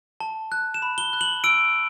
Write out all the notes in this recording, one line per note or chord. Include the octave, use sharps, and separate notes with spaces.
A5
F#6
E7
B5
G7
F#6
F#7
E6 D7